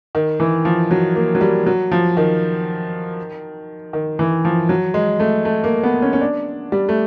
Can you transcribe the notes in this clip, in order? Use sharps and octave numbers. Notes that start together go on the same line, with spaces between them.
D#3
E3
F3
F#3
A#3
F#3
G3
F#3
F3
D#3
D#3
E3
F3
F#3
G#3
A3
A3
A#3
B3
C#4
C#4
D4
G3
A3